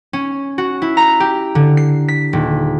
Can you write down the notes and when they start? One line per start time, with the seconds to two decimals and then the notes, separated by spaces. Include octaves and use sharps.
0.13 C#4
0.58 F#4
0.82 E4
0.97 A#5
1.20 G4
1.55 D3
1.77 C7
2.08 B6
2.33 D#1